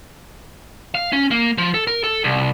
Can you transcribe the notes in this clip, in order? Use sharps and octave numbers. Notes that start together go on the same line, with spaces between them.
F5
C#4
A#3
F3
A4
A#4
A4
C2